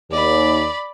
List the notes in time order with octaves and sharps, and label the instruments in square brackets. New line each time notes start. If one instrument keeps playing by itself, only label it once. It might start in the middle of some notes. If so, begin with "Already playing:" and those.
[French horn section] D#2 [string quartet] D5 B5